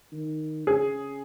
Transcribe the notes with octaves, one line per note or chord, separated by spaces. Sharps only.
D#3
C#3 G#4